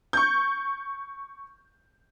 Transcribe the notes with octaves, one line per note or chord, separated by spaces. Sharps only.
C#6 G6